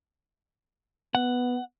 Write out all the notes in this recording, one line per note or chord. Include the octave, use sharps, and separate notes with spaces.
B3 F#5